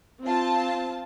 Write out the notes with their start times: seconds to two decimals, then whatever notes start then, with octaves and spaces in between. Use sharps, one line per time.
0.23 C4 F4 A5